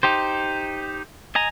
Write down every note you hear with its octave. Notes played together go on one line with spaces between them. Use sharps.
D#4 G4 C5
D#5 G#5 A#5